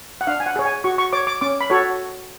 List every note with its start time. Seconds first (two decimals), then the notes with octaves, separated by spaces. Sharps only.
0.21 F#5
0.27 D4 F5
0.40 G#5
0.46 F#5
0.56 G#4 C#5
0.65 G#5
0.84 F#4 C#6
0.98 C#6
1.13 C#5 D6
1.27 D6
1.41 C#4 D6
1.61 B5
1.70 F#4 A4 C#5